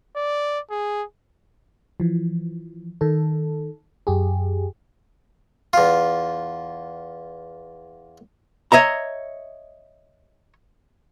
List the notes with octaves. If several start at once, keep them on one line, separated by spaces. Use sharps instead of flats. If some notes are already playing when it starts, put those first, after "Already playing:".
D5
G#4
E3 F3
D#3 A4
F#2 G4 G#4
E2 F4
C#5 D#5 E5 A#5